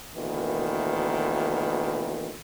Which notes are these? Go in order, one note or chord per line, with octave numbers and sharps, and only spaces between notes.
D2 B2 D#3 E3 A#3